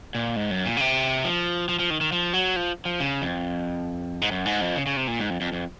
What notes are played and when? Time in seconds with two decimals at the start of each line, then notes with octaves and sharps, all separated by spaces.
0.15 A#2
0.36 G#2
0.51 F#2
0.66 A#2
0.77 C#3
0.81 C3
1.25 F3
1.69 F3
1.79 F3
1.90 D#3
2.01 D#3
2.12 F3
2.33 F#3
2.56 F3
2.85 F3
3.00 C#3
3.22 F2
4.21 G#2
4.31 F#2
4.46 G#2
4.61 F2
4.76 C#3
4.86 C#3
4.97 C3
5.08 A#2
5.20 G#2
5.30 F2
5.41 F2
5.53 F2